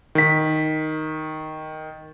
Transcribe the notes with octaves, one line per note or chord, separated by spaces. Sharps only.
D#3 B6